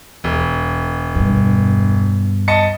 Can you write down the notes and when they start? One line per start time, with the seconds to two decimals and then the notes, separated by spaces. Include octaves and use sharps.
0.24 E1
1.15 G2 B2
2.48 D#5 A5 C#7